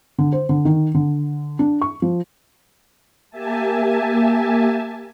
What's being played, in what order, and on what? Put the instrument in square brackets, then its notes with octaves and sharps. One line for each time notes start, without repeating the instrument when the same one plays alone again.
[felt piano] D3
C5
D3
D#3
D3
D4
C#6
F3
[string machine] A#3 G4 E5 G#5 A5